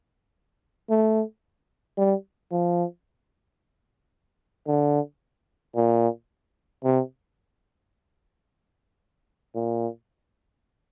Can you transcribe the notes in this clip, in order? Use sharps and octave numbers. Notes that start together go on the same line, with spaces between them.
A3
G3
F3
D3
A#2
C3
A#2